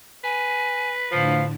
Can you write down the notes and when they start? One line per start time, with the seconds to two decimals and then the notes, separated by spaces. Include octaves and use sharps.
0.24 B4 G#5
1.12 A2 D3 F3 F5